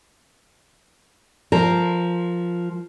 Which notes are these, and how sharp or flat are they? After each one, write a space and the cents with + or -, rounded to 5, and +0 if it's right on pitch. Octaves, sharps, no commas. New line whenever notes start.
F3 +0 A#4 -5